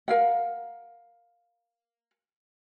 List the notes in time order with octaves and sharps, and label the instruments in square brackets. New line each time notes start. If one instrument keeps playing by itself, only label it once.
[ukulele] A#4 F5 F#5